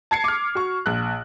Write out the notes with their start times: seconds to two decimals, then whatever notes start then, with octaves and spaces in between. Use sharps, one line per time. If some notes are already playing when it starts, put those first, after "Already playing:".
0.11 A5 G#6 C7 C#7
0.24 D6 F6
0.55 F#4 C#6
0.86 A#1 F#6